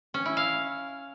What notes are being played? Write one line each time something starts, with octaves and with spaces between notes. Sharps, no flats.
C#4
E4
F5